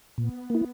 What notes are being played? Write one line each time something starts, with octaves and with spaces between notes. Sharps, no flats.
A#2 B3
A#3 E4